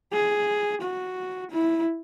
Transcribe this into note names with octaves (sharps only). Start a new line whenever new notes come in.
G#4
F#4
E4